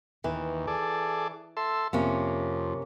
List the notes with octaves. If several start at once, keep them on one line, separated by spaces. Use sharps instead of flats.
D#2 E3
G#4 A4 D5
A4 E5 C6
F2 C3 A#3 C#4